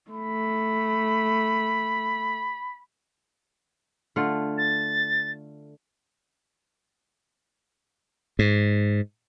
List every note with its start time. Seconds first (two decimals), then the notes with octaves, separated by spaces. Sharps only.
0.11 A3 B5
4.16 D3 A3 F4
4.57 A6
8.39 G#2